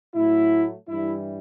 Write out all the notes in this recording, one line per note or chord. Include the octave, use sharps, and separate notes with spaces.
A2 F#3 A3 E4
G2 E3 G3 E4